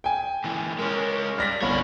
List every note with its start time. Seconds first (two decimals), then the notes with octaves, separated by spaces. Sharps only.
0.04 G5 G#5
0.44 A#2 E3
0.79 G#3 C#4 A#4
1.38 G2 D5 F6 A#6 B6
1.62 G1 C2 D4 C#5 B5